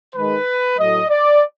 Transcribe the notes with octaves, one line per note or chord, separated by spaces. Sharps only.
D#3 G#3 B4
A2 F#3 A3 D#5
D5